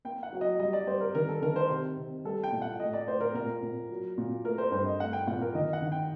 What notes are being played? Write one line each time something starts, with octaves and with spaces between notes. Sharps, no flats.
A#3 G5
F#5
F#3
D#5
G3 D#5
D5
G3 C5
A#4
D#3 A#4
A4
D#3 A#4
C5
C3
C3
G3 A4
G5
A#2
F#5
A2 D#5
D5
A2 C5
A#4
A#2 A#4
A#2
F#3
A#2
A3 A#4
C5
G2 C5
D#5
A3 F#5
G5
A#2 F#5
A#4
D#3 D#5
F#5
D#3
G5